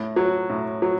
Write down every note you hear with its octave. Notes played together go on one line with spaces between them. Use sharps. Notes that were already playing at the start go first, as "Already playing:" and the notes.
Already playing: A2
F#3
A2
F#3